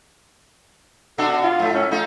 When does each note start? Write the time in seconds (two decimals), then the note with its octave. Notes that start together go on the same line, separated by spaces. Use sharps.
1.18 B2 D4 F#4 A4
1.44 F4
1.59 G#2 A3
1.75 C#4
1.91 A3 D#4 F4